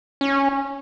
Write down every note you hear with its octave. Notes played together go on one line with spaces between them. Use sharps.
C#4